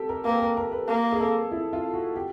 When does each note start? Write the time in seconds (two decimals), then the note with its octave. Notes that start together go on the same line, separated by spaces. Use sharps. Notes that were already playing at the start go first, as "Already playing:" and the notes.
Already playing: G4 A4
0.09 A#4
0.25 A#3 B4
0.41 A#4
0.57 A#4
0.72 B4
0.89 A#3
1.12 G#4
1.20 A4
1.51 E4
1.73 F4
1.94 F#4
2.16 G4